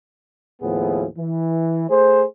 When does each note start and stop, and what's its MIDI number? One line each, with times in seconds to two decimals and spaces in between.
0.62 1.07 39
0.62 1.07 45
0.62 1.07 53
0.62 1.07 59
0.62 1.07 68
1.18 1.85 52
1.90 2.25 57
1.90 2.25 68
1.90 2.25 72